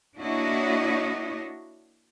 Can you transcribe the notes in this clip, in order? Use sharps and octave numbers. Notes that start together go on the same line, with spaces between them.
A#3 D4 E4 F#4 C#5 D#5